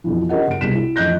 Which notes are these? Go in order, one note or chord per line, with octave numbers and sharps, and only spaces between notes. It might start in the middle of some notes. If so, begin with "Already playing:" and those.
F2 B2 E3
C#4 G4 A#4 D#5 F#5
F#1 D7
C2 B2 G3 G#4 B6 E7
E4
A1 F2 D#5 F#6 G6 A#6